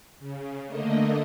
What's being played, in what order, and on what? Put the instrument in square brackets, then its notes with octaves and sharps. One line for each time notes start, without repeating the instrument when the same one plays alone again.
[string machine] C#3
D3 A3 A#3 D#5